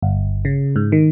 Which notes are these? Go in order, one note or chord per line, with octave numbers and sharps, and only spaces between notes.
G1
C#3
G#2
D#3